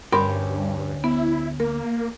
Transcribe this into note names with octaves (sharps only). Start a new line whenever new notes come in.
D2 G2 C#4 G4 A#4 B5 C6
B3 E4
A#3 A#4